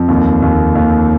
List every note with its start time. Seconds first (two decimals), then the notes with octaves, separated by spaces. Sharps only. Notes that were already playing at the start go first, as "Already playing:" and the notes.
Already playing: F2
0.08 D#2
0.42 D#2
0.75 D#2